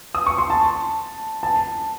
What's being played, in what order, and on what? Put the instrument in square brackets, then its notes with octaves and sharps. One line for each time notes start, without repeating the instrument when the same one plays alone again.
[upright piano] D#6
C#6
C6
A5
A5